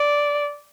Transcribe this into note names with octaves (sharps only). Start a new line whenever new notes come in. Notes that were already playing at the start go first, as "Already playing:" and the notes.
Already playing: D5